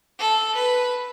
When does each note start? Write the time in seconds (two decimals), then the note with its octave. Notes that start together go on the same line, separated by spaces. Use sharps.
0.19 A4
0.55 B4